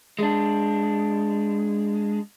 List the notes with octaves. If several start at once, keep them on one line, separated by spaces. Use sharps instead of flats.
G#3 D4